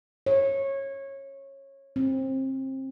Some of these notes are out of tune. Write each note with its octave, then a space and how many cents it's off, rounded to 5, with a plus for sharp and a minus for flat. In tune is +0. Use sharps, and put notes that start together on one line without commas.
C#5 -20
C4 +25